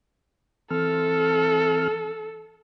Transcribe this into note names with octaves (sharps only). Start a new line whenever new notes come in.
E3 C4 A4 F6